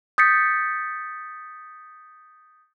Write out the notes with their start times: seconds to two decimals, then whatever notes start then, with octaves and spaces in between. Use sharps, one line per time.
0.18 D#6 G6 A6 B6 C#7